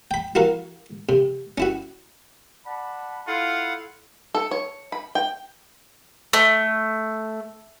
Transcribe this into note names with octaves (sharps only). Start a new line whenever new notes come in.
G5 B5
E4 F#4 A#4 F5
C3
C#4 E4 F#4
D5 F#5 A5 B5
E4 F4 A4 F5 F#5
A4
C#5
B5
G5
A3